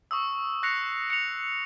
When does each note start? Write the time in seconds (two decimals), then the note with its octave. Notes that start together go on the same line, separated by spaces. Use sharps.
0.11 C#6 D#6 E6
0.63 C#6 F#6 A#6 C7 C#7 F7
1.10 C#7 F7